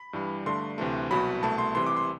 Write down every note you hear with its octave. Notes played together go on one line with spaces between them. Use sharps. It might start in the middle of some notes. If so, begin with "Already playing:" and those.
Already playing: B5
G2 E3 G3
G2 D3 A3 C6
D2 C3 E3 A3
C2 B2 F#3 B5
C2 B2 A3 A5
C6
C2 C3 E3 C6
D6
C6